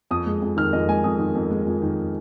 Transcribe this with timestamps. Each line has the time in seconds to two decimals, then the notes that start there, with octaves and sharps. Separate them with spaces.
0.11 F2 D#6
0.26 G#3
0.42 F2
0.57 D#3 F6
0.73 F2 D#5
0.88 G#3 G#5
1.04 F2 D#6
1.19 D#3
1.35 F2
1.51 G#3
1.66 F2
1.82 D#3